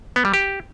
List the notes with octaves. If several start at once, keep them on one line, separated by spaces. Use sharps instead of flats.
B3
G3
G4